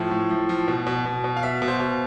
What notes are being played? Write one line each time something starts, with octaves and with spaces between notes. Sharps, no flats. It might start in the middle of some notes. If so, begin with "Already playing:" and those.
Already playing: A2 F3
A2
F3
F3
B2
B2
B2
B2
F5
B2 E5
B2
C5
B2